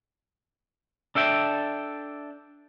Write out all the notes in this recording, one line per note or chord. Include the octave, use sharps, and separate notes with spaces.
D4 A4 E5 G5